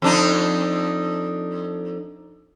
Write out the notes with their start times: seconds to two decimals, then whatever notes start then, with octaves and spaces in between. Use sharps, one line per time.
0.02 F2 D4 D#4